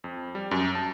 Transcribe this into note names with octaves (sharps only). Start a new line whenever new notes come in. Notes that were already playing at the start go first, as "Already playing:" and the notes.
F2
G3
F#2
A5